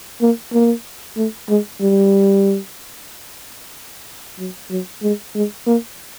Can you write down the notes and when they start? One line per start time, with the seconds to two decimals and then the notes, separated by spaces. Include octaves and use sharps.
0.21 A#3
0.53 A#3
1.17 A3
1.49 G#3
1.81 G3
4.39 F#3
4.70 F#3
5.02 G#3
5.35 G#3
5.66 A#3